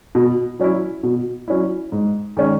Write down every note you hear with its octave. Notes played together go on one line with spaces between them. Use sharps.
B2
F#3 C#4 E4
B2
F#3 C#4 E4
G#2
D#3 G#3 C#4